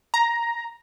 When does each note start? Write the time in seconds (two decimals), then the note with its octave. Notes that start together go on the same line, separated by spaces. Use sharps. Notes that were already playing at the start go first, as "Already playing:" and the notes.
0.14 A#5